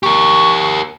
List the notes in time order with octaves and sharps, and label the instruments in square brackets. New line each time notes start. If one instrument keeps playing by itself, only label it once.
[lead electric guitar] G4 A#4 [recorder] C#6